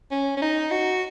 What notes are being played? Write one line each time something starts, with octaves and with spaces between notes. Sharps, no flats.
C#4
C#4
D#4
F#4